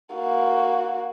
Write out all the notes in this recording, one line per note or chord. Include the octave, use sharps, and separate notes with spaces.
A#3 F#4